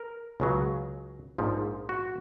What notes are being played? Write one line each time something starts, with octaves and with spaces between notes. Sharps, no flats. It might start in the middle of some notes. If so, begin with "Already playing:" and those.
Already playing: A#4
C#2 C#3 F#3
A#1 G#2 F3
F#4